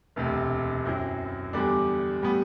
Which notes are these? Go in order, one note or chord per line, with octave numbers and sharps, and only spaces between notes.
E1 D2 C3
F#2 F#3 C4 E4
E2 D3 G3 D4
A2 G3 B3